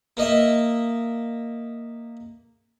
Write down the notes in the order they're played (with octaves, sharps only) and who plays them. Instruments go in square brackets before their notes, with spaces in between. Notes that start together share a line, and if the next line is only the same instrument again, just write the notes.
[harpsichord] A#3 D#5 E5